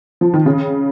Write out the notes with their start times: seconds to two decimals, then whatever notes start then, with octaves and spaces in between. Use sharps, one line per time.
0.21 F3
0.34 D#3
0.46 C#3